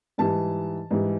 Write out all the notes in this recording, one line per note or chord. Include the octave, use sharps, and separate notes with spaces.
G#2 E3 G3 A5
G#2 E3 G3